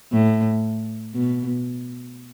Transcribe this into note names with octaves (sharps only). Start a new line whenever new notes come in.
A2
B2